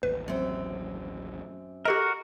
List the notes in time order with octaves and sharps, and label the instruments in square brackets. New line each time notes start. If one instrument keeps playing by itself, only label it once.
[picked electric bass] A1 D#2 [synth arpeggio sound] B4
[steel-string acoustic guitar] F#2 C4
[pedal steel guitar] F#4 A#4 [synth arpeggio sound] G4 A4 D#5